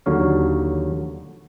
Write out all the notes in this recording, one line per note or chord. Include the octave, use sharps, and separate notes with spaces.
D#2 D3 F#3 C#5 F5